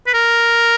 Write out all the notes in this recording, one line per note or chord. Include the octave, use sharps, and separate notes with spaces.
B4
A#4